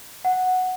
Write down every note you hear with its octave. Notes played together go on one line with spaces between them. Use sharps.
F#5